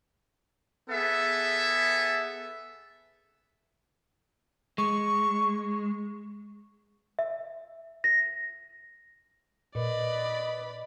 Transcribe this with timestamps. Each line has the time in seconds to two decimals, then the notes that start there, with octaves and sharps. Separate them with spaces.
0.89 B3 G#4 A4 E5
4.78 G#3 C#6
7.19 E5
8.04 A#6
9.75 A#2 B4 D5 D#5 B5